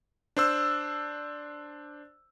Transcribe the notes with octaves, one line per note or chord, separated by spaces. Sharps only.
D4 C5 E6